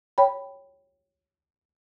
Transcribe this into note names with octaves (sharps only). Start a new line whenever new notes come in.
C#5 G5 B5